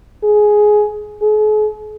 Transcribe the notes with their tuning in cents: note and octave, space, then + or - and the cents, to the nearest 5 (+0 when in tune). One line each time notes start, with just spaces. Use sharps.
G#4 +10
G#4 +45